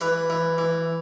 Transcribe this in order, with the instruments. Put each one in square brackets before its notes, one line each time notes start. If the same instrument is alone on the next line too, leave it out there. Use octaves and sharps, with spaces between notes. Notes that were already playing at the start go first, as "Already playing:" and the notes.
[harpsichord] E3 B4
E3
E3